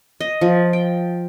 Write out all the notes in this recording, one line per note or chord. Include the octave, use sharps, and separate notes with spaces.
D#5
F3
G5